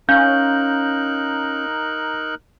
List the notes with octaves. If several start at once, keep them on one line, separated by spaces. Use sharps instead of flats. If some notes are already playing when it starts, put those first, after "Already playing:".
C#4 D#4 A#4 F5 F#6 G6